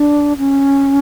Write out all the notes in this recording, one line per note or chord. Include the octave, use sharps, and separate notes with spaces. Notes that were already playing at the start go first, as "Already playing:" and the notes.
Already playing: D4
C#4